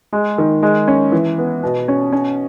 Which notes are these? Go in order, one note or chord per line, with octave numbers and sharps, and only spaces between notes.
G#3
D#3
G#3
C#4
E3
B3
B2
C#4
C#4